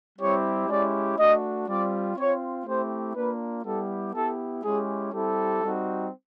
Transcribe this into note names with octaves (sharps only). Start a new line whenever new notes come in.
G3 C4 E4 G4 C#5
G#3 C#4 E4 G4 D5
A3 D4 F#4 D#5
G3 C4 F4 D5
C4 F4 C#5
A3 C4 E4 G4 C5
A#3 D4 F4 B4
G3 B3 E4 G4 A4
B3 E4 G4 A4
G#3 C#4 E4 G4 G#4
G3 C4 E4 G4 A4
G3 C4 D#4 F#4